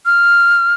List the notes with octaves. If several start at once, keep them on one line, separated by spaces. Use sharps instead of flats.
F6